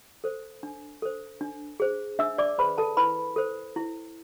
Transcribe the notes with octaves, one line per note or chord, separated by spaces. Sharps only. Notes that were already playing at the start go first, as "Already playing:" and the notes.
A4 C5
D4
A4 C5
D4
G#4 C5
D4 E5 E6
D5 D6
G#4 B4 C5 B5
A4 A5
E4 B4 B5
A4 C5
E4